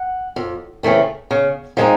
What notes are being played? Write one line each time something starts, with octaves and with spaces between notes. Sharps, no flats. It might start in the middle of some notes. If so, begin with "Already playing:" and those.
Already playing: F#5
F2
C#3 E3 A3 C4
C#3
F3 G#3 C4 D#4